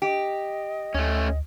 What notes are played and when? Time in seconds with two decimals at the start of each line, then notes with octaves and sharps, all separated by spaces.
0.02 G4 D#5
0.94 D2 A3 C#4